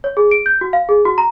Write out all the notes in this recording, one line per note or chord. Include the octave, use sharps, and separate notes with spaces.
C#5
G#4
D7
G6
F#4
F5
G#4
F#4
A#5